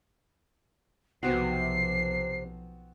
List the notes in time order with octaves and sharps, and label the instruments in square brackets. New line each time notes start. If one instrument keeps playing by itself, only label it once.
[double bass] B1 F3 [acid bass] C3 [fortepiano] B3 C4 F#4 [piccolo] C7